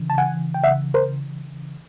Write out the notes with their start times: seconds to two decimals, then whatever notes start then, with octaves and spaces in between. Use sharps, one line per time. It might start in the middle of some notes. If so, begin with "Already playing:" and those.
Already playing: C#3 E3
0.10 A5
0.18 F#5 G#5
0.54 G5
0.64 E5 F#5
0.94 A#4 C5